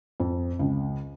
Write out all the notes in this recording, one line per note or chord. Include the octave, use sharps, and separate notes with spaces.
F2
C#2